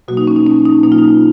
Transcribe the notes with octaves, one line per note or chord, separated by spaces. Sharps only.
B2 F#3 A#3 F#4
D#4
C#4
D#4
C#4
D#4
B2 F#3 A#3 D#4
F4
D#4